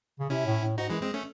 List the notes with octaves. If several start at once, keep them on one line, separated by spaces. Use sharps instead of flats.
C#3
C3 C#4 E4
A2
A2
G#2 D#4 F#4
F#2 E3 G#3
G#3 C4
A3 C#4